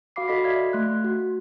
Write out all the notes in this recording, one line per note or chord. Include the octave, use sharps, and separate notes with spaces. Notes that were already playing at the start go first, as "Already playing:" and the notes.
F#4 F5 B5 D6 C7
F#4 A4 D#5 B5 A#6 B6
D5 E5 F5 G#6 B6
A3 C6 F#6
F#4